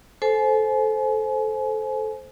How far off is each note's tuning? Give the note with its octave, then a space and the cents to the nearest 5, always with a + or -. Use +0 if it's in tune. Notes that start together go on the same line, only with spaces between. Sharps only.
A4 -15 C5 +0 G#5 +35